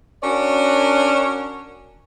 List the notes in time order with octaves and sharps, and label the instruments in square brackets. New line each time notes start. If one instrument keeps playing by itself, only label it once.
[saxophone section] C#4 D4 F#4 A#4 C#5 D5